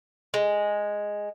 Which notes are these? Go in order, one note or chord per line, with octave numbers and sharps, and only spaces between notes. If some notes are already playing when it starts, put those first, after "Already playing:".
G#3